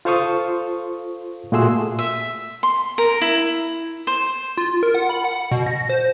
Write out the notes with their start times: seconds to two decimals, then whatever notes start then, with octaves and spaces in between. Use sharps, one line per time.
0.05 F4 A4 C5 F5 C#6 D#6
1.52 A#2 A3 F#4 G#4 C6 E6
1.99 E5
2.63 C6
2.98 A#4
3.21 E4
4.07 C5
4.57 F4
4.83 A#4
4.95 F#5
5.10 B5
5.24 F#5
5.52 B2
5.66 A#6
5.89 C5